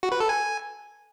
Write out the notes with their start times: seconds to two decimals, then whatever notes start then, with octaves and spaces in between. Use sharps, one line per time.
0.03 F#4
0.12 B4
0.20 A4
0.29 G#5